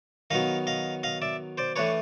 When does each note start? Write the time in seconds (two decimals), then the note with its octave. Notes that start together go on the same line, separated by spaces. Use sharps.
0.31 D#3 F#3 B3 D#5 F5
0.67 D#5 F5
1.03 D#5 F5
1.22 D5 E5
1.58 C5 D5
1.76 E3 A3 D4 B4 C#5